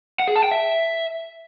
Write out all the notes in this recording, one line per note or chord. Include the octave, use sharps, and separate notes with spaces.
F#5
G#4
A5
G5
E5